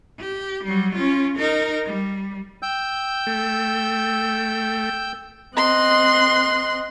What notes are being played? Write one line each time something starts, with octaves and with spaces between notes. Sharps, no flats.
G4
F#3 G3
C#4 F4
D#4 A#4
G3
G5 E6 G6
A3
C4 D#5 C6 F#6